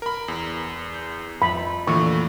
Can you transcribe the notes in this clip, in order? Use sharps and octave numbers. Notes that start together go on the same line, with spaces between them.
A#4 B5
E2
G6
F2 B5
A#2 D3 E3 A3 C#6